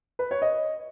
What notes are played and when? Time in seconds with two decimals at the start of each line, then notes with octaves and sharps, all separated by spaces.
0.19 B4
0.31 C#5
0.42 D#5